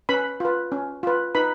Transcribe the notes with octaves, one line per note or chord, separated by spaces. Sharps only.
C#4 B4 B5
F4 B4
C#4
F4 B4
D#4 B4 B5